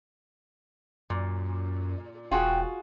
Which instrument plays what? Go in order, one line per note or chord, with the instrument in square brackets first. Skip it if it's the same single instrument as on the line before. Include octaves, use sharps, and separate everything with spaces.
[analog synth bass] F#2 [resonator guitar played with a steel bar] A#2
[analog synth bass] E1 [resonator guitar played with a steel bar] F4 F#4 G#4 [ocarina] G5